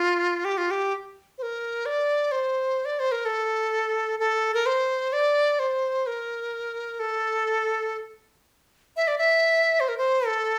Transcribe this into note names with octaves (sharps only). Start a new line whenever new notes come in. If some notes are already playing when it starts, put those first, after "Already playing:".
Already playing: F4
G4
F4
G4
C5
A#4
D5
C5
D5
C5
A#4
A4
A4
A#4
C5
D5
C5
A#4
A4
E5
D5
E5
C5
A#4
C5
A4